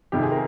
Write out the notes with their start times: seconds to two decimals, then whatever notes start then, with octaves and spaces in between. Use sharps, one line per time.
0.12 F2 C3 D#3 G4
0.22 G#4
0.32 A#4